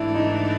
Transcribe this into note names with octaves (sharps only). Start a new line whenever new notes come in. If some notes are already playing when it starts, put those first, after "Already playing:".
Already playing: G#2 E3 A3 D4 E4
D#4